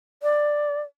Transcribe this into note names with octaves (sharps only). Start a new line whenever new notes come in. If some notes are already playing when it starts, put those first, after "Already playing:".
D5